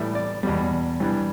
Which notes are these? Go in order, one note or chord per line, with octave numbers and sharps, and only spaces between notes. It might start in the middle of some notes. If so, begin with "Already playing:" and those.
Already playing: A2 E3 G3 E5
D5
E2 B2 G3
G2 E3 G3